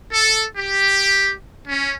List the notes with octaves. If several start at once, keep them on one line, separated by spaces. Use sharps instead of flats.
A4
G4
C#4